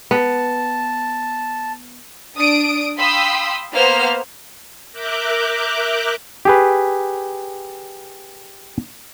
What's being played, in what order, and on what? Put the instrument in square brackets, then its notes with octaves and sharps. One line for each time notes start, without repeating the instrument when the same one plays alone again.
[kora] B3 [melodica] A5
[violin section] D4 D#6 D7
F5 G5 B5 C6 D#6 E6
A#3 B3 C5 F6
[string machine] A#4 E5 A#5 D6 F#6 G6
[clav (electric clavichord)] G4 G#4 B4